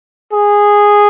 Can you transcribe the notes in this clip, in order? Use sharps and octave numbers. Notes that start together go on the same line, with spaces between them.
G#4